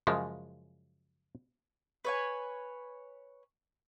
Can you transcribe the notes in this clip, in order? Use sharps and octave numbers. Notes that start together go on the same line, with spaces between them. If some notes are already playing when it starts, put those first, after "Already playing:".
F#2 C#3 F3 G#3
B4 C#5 G#5